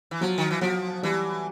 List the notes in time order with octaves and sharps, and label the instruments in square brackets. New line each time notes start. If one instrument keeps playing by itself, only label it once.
[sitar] E3
[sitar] F3 [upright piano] F#3
[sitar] D#3
E3
[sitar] F3 [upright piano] F#3
[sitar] E3 [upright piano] G3